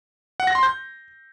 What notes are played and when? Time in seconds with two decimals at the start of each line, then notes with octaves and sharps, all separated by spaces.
0.40 F#5
0.47 A#6
0.55 C6
0.63 G6